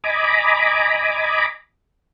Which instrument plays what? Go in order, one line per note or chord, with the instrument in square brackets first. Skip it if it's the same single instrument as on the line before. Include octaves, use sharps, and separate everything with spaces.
[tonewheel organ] D#5 G#5 A#5 B5 D6